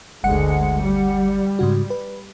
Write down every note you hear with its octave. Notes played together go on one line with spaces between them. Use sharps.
G1 D2 G#3 F#5 C#7
G3
G#2 C#3 F#4
B4